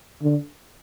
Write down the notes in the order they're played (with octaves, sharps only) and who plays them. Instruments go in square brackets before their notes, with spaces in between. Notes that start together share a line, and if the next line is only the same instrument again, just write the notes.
[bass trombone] D3